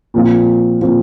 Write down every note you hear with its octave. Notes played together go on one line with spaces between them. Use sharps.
A#2 F3 C4 F4
A#2 F3 C4 F4